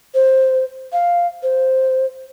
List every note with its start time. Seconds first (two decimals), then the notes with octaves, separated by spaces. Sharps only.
0.14 C5
0.92 F5
1.43 C5